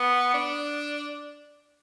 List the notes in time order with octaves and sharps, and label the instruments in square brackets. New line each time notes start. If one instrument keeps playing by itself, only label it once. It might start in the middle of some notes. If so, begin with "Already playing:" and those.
Already playing: [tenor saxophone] B3
D4